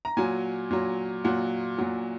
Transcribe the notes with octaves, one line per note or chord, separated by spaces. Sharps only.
A#5
A#2 F#3 G#5
A#2 F#3
A#2 F#3 F#5
A#2 F#3